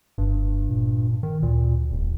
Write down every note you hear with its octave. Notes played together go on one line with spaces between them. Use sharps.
F#1 G2
A#2
D#3
D2 A#2
D1 D#2